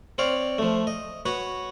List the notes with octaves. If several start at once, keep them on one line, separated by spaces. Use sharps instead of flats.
C4 C#5 D5 F5
F3 A3
D#5
F#4 B4 C#5